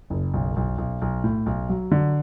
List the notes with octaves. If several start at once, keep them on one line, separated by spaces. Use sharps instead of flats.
F#1
B1
B1
B1
B1
A2
B1
F#3
D3